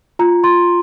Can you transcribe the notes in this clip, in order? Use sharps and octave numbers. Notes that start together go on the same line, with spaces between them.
F4 A#5
F4 C6